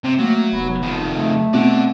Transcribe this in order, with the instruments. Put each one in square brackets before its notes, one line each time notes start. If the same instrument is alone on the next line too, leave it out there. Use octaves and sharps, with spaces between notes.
[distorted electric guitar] C3 [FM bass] C4
[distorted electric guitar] F#3 [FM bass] A3 [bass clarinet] A#3
[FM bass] F1 [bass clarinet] B3
[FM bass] F1 [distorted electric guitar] F2 D#3
[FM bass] C#3 [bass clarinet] A3
[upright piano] B2 [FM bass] C4 [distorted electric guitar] D5 F#5